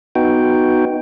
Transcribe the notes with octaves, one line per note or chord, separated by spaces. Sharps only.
B3 D#4 F#4 G5